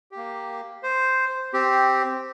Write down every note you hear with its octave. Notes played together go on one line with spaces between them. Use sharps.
A#3 G4
C5
C4 G4